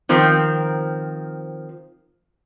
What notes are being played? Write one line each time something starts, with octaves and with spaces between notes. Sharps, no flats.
D#3 F3 C4 A#4